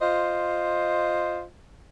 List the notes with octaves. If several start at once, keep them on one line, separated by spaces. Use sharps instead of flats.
F4 C5 D#5